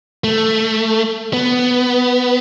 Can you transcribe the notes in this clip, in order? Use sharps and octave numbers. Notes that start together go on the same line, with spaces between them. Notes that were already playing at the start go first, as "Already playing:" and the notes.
A3
B3